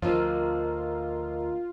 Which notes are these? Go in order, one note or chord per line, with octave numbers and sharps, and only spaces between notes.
D2 F3 F4 A#4 D#5 A#5